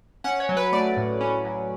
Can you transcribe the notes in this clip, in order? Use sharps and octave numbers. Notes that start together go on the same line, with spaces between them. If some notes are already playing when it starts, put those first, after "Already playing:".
C#4 F#5
C#5
F#3
B4
A3 D5
A2
C#4
F#3